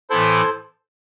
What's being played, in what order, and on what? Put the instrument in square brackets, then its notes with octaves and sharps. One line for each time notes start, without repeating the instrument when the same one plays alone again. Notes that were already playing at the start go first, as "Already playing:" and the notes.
[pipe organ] A2 E3 B3 E4 [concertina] A4 C5